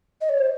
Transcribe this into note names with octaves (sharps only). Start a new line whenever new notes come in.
D#5
C#5
C5